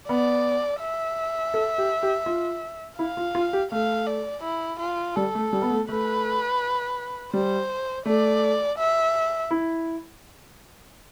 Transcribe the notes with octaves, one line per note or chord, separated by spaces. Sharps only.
B3 D5
E5
A4
G4
G4
F4
E4 F5
F4
F4
G4
A3 F5
D5
E4
F4
G3 A4
A3
G3
B3
A3
A3 B4
G3 C5
A3 D5
E5
E4